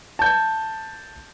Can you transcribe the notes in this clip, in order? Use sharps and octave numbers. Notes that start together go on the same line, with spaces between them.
A5 G6